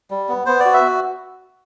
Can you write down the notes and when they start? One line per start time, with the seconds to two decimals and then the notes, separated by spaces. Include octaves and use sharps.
0.11 G3
0.29 B3
0.46 B3 C5
0.60 D5
0.65 F#4
0.74 E5